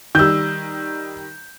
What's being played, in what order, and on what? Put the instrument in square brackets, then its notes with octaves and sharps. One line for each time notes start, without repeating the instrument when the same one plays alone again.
[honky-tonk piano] D#3 G3 [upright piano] E6 G6